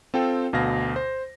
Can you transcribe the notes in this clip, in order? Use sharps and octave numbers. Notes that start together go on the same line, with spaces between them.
C4 F4 A4 G5
D2 B2 F5 A#6
C5